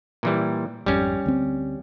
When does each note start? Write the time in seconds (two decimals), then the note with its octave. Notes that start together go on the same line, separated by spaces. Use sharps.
0.23 A#2 E3 G3
0.86 G#1 F2 G3 C#4
1.26 D2 C4